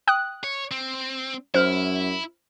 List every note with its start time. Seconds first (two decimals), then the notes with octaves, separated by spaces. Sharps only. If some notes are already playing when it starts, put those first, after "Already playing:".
0.07 G5 D#6 F#6
0.44 C#5
0.71 C4
1.54 F#2 E4 C5 F6